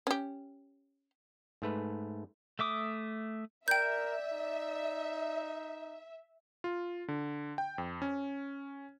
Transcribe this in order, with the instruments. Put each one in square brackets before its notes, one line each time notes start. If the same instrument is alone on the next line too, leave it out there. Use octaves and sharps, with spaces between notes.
[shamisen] C#4 G4
[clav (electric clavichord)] G#2 A3 B4
[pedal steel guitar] A3 E5 D6 D#6
[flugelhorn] A#4 [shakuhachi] D5 [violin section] E5 [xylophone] G5 G6
[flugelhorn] D#4
[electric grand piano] F4
D3
G5
F2
C#4